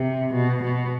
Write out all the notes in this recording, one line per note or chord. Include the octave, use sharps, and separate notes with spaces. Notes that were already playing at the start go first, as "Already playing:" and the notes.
Already playing: C3
B2
B2